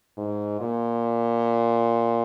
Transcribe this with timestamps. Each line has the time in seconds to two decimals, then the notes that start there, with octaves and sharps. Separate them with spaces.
0.18 G#2
0.61 A#2